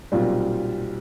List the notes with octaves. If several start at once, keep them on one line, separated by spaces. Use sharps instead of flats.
B1 A#2 G3 C4 F4